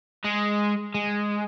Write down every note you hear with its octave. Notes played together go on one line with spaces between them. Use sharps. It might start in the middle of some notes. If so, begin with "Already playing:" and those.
G#3
G#3